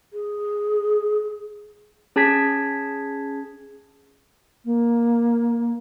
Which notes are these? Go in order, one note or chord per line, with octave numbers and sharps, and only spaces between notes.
G#4
C#4 G#4 A5 G#6 B6
A#3